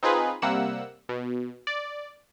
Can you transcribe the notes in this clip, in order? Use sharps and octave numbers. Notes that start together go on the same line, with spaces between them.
C4 D#4 F4 G#4 B4
C3 G3 A#3 F#5 E6
B2
D5